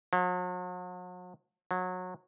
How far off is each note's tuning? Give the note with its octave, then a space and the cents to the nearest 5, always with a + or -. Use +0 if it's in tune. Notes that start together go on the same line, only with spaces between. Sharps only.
F#3 -45
F#3 -25